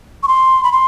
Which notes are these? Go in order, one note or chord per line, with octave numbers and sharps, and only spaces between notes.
C#6
C6
B5
C6